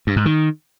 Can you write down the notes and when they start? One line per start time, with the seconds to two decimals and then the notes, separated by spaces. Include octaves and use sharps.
0.07 G2
0.16 G#2
0.26 D#3